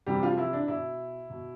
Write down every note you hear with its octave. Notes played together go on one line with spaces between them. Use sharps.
C3 E3 G3 G4
F3 F4
E4
D4
B2 E4
B2